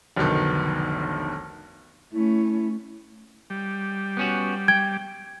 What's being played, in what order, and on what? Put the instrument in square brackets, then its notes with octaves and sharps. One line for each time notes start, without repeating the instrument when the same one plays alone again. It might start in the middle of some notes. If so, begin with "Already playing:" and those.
[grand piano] F1 B1 B2 D3 D#3
[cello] A3 C#4 [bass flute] E4
[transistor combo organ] G3
[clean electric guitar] B3 C#4 F#4
[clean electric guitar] G5 [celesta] G#6